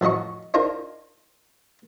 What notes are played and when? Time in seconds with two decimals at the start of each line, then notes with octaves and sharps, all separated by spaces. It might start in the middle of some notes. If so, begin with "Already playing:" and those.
0.01 A1 F3 F#3 D#5 C#6
0.54 D4 D#4 F4 A#4 C5 A#5